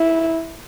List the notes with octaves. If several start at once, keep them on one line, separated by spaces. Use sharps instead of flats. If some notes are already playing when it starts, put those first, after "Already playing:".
Already playing: E4